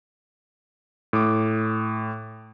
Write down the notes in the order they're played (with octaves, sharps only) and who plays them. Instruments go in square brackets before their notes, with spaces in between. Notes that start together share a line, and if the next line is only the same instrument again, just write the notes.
[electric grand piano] A2 D6